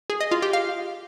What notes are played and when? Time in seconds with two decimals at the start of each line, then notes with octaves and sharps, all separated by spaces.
0.10 G#4
0.21 D#5
0.31 F4
0.42 G4
0.53 F5